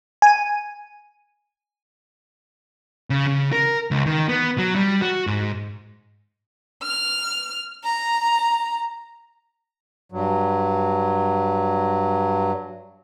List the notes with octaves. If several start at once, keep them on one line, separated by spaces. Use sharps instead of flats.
G#5 D#7
C#3
C#3
A#4
C#2
D#3
B3
F#3
G3
F#4
G#2
F6
A#5
G2 F#3